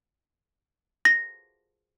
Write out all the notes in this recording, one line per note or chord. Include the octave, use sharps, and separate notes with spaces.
A#6